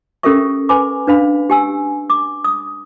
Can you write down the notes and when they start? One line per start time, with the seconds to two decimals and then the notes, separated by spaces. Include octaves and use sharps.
0.23 C#4 G4 A4 A#4 E5 C#6
0.69 B4 G#5 B5 D6
1.07 D4 B4 F5 B5
1.50 G4 G#5 E6
2.10 D6
2.44 D#6